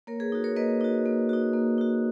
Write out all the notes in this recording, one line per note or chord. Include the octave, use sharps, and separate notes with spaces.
A#3 A#4 C#5
G#4 B4
D#4 F#4
A#4 C#5
A#3 B4 D#5
D#4 F#4
A#3
D#4 F#4
A#3
D#4 F#4